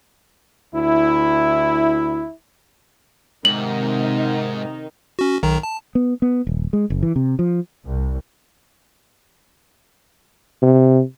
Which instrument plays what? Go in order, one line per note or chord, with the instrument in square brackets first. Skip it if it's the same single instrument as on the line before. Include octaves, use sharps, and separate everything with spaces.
[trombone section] D2 E4
[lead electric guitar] G#2 [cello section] C3 [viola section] D#3 D#4 [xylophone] F#7
[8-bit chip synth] C#4 F#4
B1 D#3 A#5
A5
[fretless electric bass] B3
B3
D#1
G#3
F#1
E3
C3
F3
[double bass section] C2
[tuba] C3